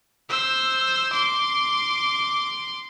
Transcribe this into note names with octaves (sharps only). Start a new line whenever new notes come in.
C5 E6
C6 D6